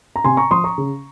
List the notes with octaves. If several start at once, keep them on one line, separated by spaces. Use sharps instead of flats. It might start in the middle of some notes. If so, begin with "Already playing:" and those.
A#5
C3 G#5 C6
A#5 C#6
F3 C6 D#6
A#5 C#6
C#3